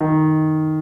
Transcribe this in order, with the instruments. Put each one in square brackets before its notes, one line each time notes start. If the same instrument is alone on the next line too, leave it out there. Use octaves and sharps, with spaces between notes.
[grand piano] D#3